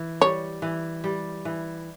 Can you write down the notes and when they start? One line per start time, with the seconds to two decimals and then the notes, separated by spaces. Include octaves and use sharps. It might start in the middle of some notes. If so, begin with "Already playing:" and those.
Already playing: E3
0.21 G3 C#5
0.62 E3
1.04 G3
1.45 E3